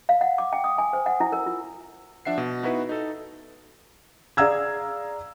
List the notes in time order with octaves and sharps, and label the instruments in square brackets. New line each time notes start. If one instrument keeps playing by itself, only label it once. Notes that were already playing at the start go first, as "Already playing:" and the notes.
[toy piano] F5
F#5
D6
G5
D#6
G#5
C5
F#5
E4
A#4
F4
[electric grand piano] F3 D4 E5 F#5 C7
B2
B3 D#4 E4 F#4 B4
D#4 A4
[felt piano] G#4 D5 F5 A#5 E6 G#6